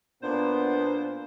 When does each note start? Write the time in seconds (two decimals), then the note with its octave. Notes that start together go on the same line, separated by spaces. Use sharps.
0.23 A#2 A#3 B3 D4 C5